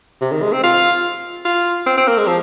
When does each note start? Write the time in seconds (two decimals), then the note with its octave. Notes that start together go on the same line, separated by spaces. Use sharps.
0.21 C3
0.32 D#3
0.42 G#3
0.52 C4
0.63 F4
1.45 F4
1.86 C4
1.97 C4
2.07 A#3
2.17 G#3
2.27 F3